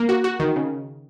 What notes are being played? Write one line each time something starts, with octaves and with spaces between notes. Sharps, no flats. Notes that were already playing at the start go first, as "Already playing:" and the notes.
Already playing: A#3
F#4
F#4
D#3
C#3